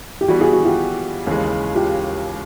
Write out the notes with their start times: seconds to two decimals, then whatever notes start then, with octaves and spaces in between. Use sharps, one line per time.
0.21 G4
0.28 E3 G3 B3 F#4
0.41 F#4 G#4
0.53 F#4
0.65 F4 G4
1.27 D#2 C#3 E3 G#3
1.75 F4 G4